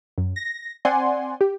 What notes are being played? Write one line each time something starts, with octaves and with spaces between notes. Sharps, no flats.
F#2
A#6
C4 D5 F#5 G#5 C6
G4